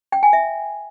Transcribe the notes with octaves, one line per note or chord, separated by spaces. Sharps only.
G5
G#5
E5